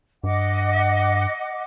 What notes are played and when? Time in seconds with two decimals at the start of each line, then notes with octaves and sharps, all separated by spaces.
0.24 G2 D#5 F#5 D6